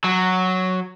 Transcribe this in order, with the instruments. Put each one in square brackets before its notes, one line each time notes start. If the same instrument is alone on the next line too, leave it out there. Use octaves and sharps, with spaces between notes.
[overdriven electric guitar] F#3